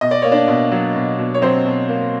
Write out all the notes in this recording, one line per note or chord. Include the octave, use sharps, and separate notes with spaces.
B2 D#5
D5
A#3 C#5
D4 D5
B2
F#3
B2
B2
C#5
F#3 C4 C5
B2
A#3